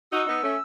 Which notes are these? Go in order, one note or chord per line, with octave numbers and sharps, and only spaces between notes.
D#4 F#4 E6
B3 D#4
A3 C#4